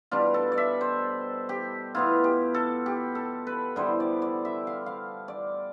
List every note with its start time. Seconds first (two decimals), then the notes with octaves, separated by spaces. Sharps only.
0.11 B2 G3 D4 F4
0.34 A4
0.52 D5
0.58 E5
0.81 C5
1.49 G4
1.95 B2 B3 E4 F4
2.24 G4
2.54 A4
2.86 G4
3.15 A4
3.47 B4
3.76 D3 G3 B3 E4 C5
4.00 D5
4.22 D5
4.45 E5
4.67 F5
4.86 F5
5.28 D5